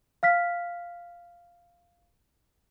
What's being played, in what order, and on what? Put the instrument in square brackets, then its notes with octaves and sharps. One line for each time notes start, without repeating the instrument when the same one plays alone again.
[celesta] F5 F6 B6